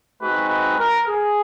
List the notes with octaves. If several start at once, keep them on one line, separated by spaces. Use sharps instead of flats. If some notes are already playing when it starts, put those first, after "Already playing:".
G#3 C4 D#4 F#4 B4
B4
A#4
G#4